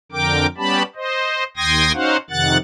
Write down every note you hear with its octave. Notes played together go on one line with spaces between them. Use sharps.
F2 D3 A#4 G5 D6
G3 B3 C#4 G4 A5 B5
C5 D#5
D#2 G5 C6 D#6 G#6 A#6
C#4 D#4 F#4 C5 F5 F#5
F2 C3 D#3 F#5 F#6 A6